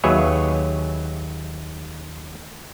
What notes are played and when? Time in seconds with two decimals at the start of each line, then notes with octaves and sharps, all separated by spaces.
0.04 D#2 F#3 G#4 B4 C#5 E5